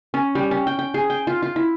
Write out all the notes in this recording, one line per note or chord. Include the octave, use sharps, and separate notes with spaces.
C#4
G3
C#4
G5
G5
G#4
G5
F4
F4
E4